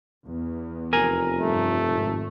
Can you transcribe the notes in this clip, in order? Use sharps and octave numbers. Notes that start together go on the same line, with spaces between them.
E2
F1 A#4 G#5
G2 A3
G#1